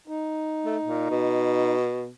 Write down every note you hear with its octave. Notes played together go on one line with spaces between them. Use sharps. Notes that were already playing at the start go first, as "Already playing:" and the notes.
D#4
A3
A#2
B2